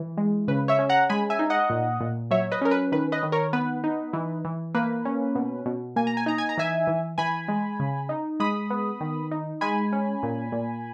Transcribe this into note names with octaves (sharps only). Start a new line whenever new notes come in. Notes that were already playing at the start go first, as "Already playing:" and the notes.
Already playing: E3
G#3
C#3 B4
C#5 E5
C#4
F#5 A#5
G#3 G#5 B5
E5 G#5
D#4
D#5 F#5
A#2
A#2
F#3 C#5 E5
B4 D#5
C#4 A#4
B4
D#3 B4
B4 D#5
D#3
A#4 C#5
B3 B4
D#4
E3
E3
A#3 B4
C#4
B2
B2
A#3 G#5
A#5
G#5
D#4 A#5
G#5
A#5
E3 E5 G#5
E3
E3 G#5 B5
G#3
C#3
D#4
G#3 B5 D#6
B3
D#3
D#4
G#3 G#5 B5
C#4
A#2
A#2